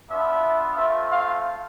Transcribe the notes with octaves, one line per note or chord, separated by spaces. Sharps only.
B3 D4 F4 E5
A3 C4 F4 E5
F5